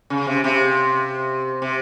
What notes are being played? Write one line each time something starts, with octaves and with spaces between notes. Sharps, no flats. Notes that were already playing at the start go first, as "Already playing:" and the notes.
C#3
C3
C3
C3